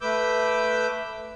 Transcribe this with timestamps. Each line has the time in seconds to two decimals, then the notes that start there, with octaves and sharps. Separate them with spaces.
0.01 A3 B4 D6 E6 G6